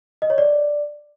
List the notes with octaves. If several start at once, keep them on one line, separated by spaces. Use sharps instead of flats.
D#5
C#5
D5